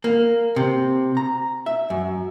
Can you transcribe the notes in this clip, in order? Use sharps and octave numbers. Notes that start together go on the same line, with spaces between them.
A#3
C3
A#5
E5
F#2